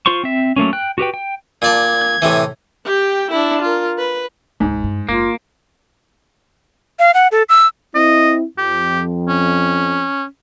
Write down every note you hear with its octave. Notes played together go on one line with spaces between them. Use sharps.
F4 C5 C6 C#6
C4 E5
F#3 A3 A#3 C#4
G5 F#6
F#4 G4 B4 G5
G5
A#2 D5 A5 G#6
A2 C3 E3
G4 G5
D4 E4
F4 A#4
B4
E1 C#2 G#2
G2
F#1 A#3 F4
F5
F#5
A4
E6
C4 E4 D#5
F2 G4
C#4